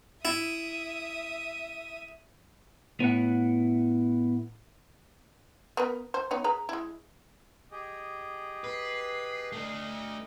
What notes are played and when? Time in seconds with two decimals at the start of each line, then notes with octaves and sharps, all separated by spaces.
0.25 E4 E5 D#6
3.00 A2 B3 E4 F#5
5.77 B3 A#4 B4
6.14 C5
6.31 B3 D#4 C#5
6.44 G#4 B4 A#5
6.69 G#3 E4
7.71 G4 G#4 D#5
8.64 B4 C7
9.52 A3 D4 D#5